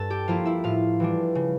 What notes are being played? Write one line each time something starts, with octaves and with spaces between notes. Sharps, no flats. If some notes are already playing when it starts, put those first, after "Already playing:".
Already playing: G2 A4 A5
G4 G5
F3 A#3 E4 F4 F5
E4 E5
A2 F4 F5
E3 G3 D4
C#3